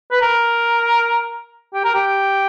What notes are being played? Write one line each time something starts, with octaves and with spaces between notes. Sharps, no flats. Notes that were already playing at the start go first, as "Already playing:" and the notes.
B4
A#4
G4
A#4
G4